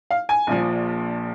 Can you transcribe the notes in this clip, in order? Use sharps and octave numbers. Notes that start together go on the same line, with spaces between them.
F5
G#5
A#1 A#2 F3